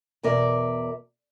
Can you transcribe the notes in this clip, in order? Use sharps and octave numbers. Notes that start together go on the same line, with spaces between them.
E2 B2 A#4 D5 E5